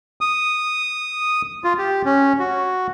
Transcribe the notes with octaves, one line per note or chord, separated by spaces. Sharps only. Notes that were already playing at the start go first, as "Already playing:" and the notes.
D#6
F4
G4
C#4
F#4